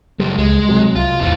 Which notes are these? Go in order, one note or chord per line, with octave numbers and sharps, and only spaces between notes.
C#2 F#2 G3
C#2 G#3
C3 F#3
C2 F4
D1 E2 E3 F4